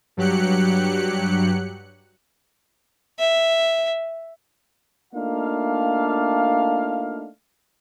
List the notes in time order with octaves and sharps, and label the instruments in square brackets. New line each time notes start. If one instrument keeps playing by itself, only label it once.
[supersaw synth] G2 F#3 G4 F#6 C#7
[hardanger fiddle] E5
[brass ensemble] A3 A#3 D4 D#4 F4 F5